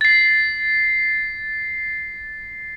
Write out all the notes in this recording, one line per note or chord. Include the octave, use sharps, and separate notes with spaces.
A6 C7